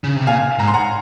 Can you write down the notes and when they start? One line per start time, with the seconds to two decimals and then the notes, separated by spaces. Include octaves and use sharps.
0.04 C#3
0.16 C3
0.27 A#2 F5 G#5
0.59 G#2 A#5
0.68 C6
0.74 F#5 A#5